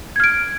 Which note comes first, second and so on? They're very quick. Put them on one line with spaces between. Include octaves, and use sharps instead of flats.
G#6 F6 D7